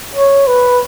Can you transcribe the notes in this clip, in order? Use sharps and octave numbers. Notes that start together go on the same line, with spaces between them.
C#5
B4